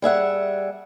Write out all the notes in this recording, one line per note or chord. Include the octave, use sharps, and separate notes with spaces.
G3 G#4 E5 F#5